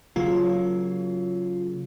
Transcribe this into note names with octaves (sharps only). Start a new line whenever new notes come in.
C#3 F#3 A#3 F4